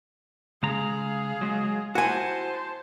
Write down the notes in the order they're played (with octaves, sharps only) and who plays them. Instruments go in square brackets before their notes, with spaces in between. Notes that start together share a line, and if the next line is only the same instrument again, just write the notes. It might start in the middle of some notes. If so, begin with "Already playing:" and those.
[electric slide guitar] C#3 G#3 A#5 [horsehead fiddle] G#4 F5
[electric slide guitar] F#3 G#3
[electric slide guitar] E4 F#4 [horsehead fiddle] C5 A5 [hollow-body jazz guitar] F#5 G#5